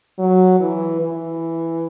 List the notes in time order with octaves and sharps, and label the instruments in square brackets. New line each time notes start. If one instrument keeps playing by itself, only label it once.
[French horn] F#3
E3
E3